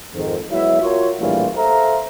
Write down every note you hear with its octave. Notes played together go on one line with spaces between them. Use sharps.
F2 G#2 D#3
F#3 G#3 B3 E4 E5
F4 F#4 A#4 C#5
A#1 A2 E3 G3 A#3 F4
A4 C5 E5 F5 A#5